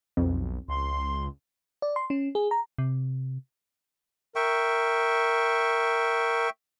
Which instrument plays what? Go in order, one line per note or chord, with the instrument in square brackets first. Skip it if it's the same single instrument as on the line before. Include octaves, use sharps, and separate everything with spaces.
[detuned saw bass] B1 [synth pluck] F2
[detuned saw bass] C#2 [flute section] C6
[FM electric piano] D5
C6
C#4
G#4
A#5
[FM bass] C3
[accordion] A#4 [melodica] E5 G5 C#6